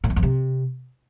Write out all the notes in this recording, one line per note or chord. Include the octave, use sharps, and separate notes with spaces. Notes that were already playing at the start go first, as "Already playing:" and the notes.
A2
E2
F2
C3